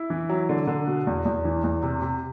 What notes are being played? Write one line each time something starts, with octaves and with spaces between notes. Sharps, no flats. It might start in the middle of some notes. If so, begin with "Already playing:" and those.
Already playing: E4
E3
F#3
D3
D3
B2
E2
E2
E3
E2
C3
C3